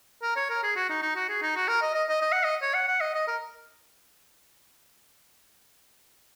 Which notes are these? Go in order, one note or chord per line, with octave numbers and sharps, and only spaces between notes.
A#4
C#5
A#4
G#4
F#4
D#4
D#4
F#4
G#4
D#4
F#4
A#4
D#5
D#5
D#5
D#5
F#5
D#5
C#5
F#5
F#5
D#5
D#5
A#4